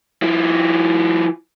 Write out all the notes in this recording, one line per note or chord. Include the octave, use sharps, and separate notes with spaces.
F3 E4